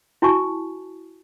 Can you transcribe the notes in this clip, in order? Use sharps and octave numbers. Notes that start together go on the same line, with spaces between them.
E4 F#4 G#5 A5 C#6